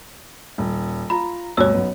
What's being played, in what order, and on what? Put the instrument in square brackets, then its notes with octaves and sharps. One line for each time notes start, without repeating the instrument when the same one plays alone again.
[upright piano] D#1
[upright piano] F4 A#5 [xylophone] B5
[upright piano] D2 G2 B2 [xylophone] C#5 E6
[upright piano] B1 F#2 B3